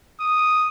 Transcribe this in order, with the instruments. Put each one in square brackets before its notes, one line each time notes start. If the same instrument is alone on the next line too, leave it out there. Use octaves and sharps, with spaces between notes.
[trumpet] D#6